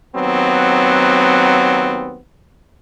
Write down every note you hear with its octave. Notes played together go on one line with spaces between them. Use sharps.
D#2 F#3 B3 C4